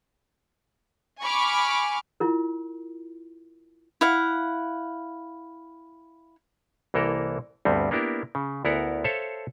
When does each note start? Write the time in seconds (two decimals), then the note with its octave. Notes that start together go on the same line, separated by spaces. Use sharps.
1.22 G#5 B5 C#6 D6 F6
2.20 E4 F4 A#4
4.01 E4 F5 F#5
6.94 C2 E3 A#3 A4 A#4
7.65 D2 G2 G3 B3 C4
7.91 A#3 B3 D4 E4 G4 A#4
8.35 C#3
8.65 D2 B3 E4 A#4 F#5 A#5
9.04 A4 C5 C#5 E5 F5 A5